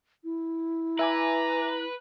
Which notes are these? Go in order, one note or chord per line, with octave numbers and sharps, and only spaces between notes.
E4
B4 E5 G#5 A#5 D6